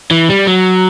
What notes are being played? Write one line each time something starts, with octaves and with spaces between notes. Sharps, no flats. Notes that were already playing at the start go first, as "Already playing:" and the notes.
E3
G3
F#3